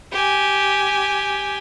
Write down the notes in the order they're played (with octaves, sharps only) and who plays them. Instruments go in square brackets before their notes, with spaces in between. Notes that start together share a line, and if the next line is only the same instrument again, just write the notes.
[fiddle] G4 G#5